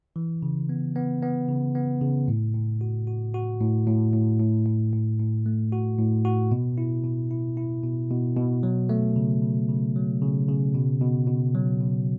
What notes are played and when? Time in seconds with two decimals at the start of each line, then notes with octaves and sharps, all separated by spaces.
0.16 E3
0.43 C#3
0.69 B3
0.96 B3
1.22 B3
1.49 C#3
1.75 B3
2.01 C#3
2.28 A2
2.54 A2
2.81 F#4
3.07 F#4
3.34 F#4
3.60 A2
3.87 A2
4.13 A2
4.40 A2
4.66 A2
4.93 A2
5.19 A2
5.46 A3
5.72 F#4
5.99 A2
6.25 F#4
6.51 B2
6.78 E4
7.04 B2
7.31 E4
7.57 E4
7.83 B2
8.11 B2
8.36 B2
8.63 F#3
8.89 A3
9.16 C#3
9.42 C#3
9.69 C#3
9.96 F#3
10.22 C#3
10.48 C#3
10.74 B2
11.01 B2
11.27 B2
11.55 F#3
11.81 B2